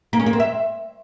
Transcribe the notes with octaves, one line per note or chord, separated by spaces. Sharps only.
A#3
C#4
A#3
C4
E5